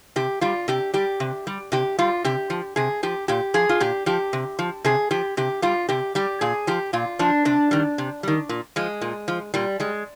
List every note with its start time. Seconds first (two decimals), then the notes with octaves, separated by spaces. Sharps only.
0.16 C3 G4
0.41 G3 F4
0.68 C3 G4
0.94 G3 G4
1.20 C3
1.47 G3
1.72 C3 G4
1.98 G3 F4
2.24 C3 G4
2.50 F3
2.76 C3 G#4
3.03 F3 G4
3.28 A#2 G4
3.54 F3 G#4
3.69 F4
3.80 A#2 G4
4.06 F3 G4
4.33 C3
4.59 F3
4.84 C3 G#4
5.11 F3 G4
5.37 C3 G4
5.62 G3 F4
5.89 C3 G4
6.15 G3 G4
6.41 A#2 G#4
6.67 F3 G4
6.93 A#2 F4
7.19 F3 D4
7.45 C3 D4
7.71 D#3 G3
7.98 C3
8.23 D#3 G3
8.49 A#2
8.76 F3 G#3
9.01 A#2
9.28 F3
9.54 A#2 G3
9.80 G3 G#3